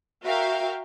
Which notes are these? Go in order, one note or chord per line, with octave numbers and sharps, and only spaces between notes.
F#4 A#4 E5 F5 G5